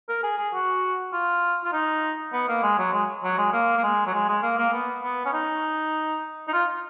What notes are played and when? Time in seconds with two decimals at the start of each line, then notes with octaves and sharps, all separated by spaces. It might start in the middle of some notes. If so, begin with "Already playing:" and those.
0.09 A#4
0.23 G#4
0.38 G#4
0.53 F#4
1.13 F4
1.64 F4
1.73 D#4
2.33 B3
2.48 A#3
2.63 G#3
2.78 F#3
2.93 G#3
3.24 F#3
3.38 G#3
3.53 A#3
3.77 A#3
3.83 G#3
4.06 F#3
4.13 G#3
4.29 G#3
4.42 A#3
4.58 A#3
4.73 B3
5.03 B3
5.25 C#4
5.33 D#4
6.48 D#4
6.53 F4